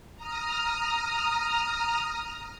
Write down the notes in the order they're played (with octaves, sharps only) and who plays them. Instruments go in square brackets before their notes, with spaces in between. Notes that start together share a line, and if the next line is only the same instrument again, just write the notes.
[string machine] A#5 D#6 F6